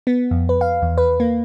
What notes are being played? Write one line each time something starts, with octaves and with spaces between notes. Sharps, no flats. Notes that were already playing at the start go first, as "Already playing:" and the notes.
B3
F2
B4
F5
E2
B4
A#3